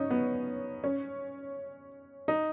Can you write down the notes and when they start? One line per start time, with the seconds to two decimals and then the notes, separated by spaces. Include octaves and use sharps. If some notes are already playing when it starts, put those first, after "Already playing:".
Already playing: C#4 D#4
0.10 B3
0.84 C#4
2.28 D#4